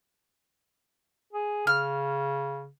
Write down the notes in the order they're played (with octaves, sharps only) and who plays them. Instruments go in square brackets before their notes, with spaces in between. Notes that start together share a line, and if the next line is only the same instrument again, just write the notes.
[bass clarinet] G#4
[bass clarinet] C#3 [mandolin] F6